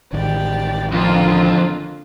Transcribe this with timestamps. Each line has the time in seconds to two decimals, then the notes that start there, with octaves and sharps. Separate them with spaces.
0.13 A1 D#3 G4 D5
0.92 F2 D3 A#3 F4